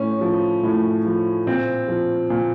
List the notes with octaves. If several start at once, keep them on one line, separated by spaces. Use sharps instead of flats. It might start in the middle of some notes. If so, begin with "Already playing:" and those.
Already playing: A2 C#4
F3
A2
F3
A#2 C4
F3
A#2